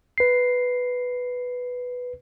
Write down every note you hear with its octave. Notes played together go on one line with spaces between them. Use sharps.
B4 C7